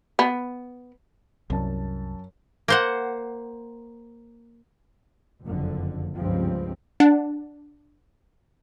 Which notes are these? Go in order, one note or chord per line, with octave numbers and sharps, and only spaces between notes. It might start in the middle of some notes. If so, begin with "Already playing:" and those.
B3
C2 F#2 A5
A#3 C5 F#5
F#1 F2 D3
C#2 G2 F3 C4
D4 F#5 A5